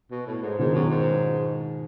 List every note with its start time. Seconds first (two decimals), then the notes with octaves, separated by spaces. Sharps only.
0.11 B2
0.27 A2
0.43 G#2
0.59 G#2 B2 D#3
0.75 F#2
0.90 G#2